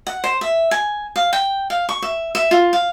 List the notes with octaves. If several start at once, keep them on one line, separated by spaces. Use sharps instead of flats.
F#5
C5
E5
G#5
F5
G5
F5
C#6
E5
E5
F4
F5